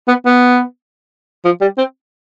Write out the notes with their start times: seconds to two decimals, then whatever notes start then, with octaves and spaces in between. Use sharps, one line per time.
0.08 B3
0.26 B3
1.45 F3
1.61 G3
1.78 C4